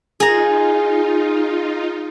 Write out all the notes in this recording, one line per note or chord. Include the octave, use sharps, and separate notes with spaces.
D#4 F4 G#4 A#5